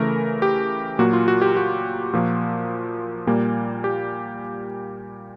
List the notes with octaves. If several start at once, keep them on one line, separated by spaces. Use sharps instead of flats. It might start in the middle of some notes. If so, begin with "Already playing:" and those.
Already playing: C#3 E3 A3 A#4
G4
A#2 F#3 A#3 F#4
F4
F#4
G4
F#4
A#2 F3 A#3
A#2 G3 A#3
G4